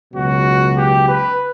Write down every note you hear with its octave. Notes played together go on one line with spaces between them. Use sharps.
C#2 B2 F#3 F#4
G4
B4